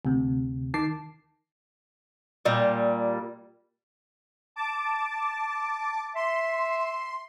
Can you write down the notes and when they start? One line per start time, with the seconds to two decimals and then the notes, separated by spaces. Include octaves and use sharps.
0.05 D2 C3
0.74 D#3 A5 D6 C7
2.45 A#2 G3
4.56 A5 D6
6.15 E5 C6